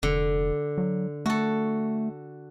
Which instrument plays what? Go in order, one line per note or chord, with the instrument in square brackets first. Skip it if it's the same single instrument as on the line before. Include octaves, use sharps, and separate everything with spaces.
[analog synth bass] F1 [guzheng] D3
[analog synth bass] F#3
[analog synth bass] A3 [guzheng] F#4 A4